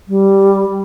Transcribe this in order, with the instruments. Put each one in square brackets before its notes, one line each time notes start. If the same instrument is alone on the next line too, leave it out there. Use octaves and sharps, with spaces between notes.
[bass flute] G3